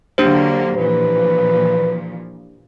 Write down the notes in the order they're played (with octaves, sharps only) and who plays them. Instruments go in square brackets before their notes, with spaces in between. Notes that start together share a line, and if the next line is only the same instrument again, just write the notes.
[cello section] D3 F#3 A#3 [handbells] D4 G4 C5
[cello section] A#2 E3 F3 [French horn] B4